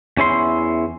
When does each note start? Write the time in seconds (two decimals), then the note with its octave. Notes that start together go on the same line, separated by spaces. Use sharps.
0.17 E2 C#4 E4 C6